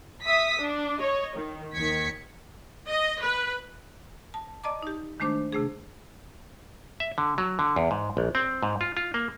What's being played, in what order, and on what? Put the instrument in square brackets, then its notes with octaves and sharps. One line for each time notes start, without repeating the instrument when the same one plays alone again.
[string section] E5 D#6 B6
D4
C#5 D#5
D#3
D#2 D#3 G#6 B6 C#7
[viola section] D#5
B4
[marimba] A5
D5 D#5 A5 A#5 D6
D#4 G4
D#3 G#3 A3 D4 C5 D6
C3 A3 D4 G#4
[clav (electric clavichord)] E5
D3
F#3
D3
E2
G#2
A#1
C4
G#2
F4
F4
A#3